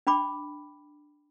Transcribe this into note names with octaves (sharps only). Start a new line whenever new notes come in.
D4 G5 B5 D6